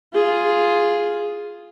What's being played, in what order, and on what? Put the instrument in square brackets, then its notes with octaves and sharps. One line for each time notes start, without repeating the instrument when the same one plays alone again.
[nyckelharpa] F4 G#4